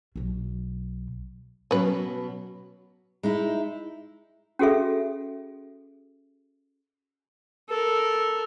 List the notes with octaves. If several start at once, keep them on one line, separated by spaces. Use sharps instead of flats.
B1 F#3
B2 F#3 B3 C#4 B4
G#3 D#4 E4
C#4 F#4 G#4 A4 E5
A4 A#4